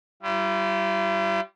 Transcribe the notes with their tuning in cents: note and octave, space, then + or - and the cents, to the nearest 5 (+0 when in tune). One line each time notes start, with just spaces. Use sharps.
G3 -25 E4 +45